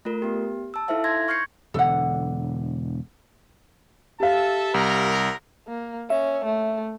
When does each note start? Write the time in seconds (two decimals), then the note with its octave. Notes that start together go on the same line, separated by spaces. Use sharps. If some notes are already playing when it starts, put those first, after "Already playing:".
0.05 A3 F4 A#4
0.22 B3 G4
0.74 A5 E6
0.88 D#4 E4 A4 C5 E5 F5
1.04 C6 G#6 A#6
1.28 C#6 F6 G6 G#6 C7 C#7
1.74 E1 D3 A4 F#5
4.20 G4 A4 E5 F5 A5
4.74 C2 A#4
5.68 A#3
6.10 C#4 E5
6.45 A3